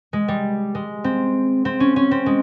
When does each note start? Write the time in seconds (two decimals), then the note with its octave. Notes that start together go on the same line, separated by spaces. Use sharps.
0.13 G#3
0.28 G3
0.75 G#3
1.04 C4
1.65 C4
1.80 C#4
1.96 C#4
2.11 C4
2.26 G#3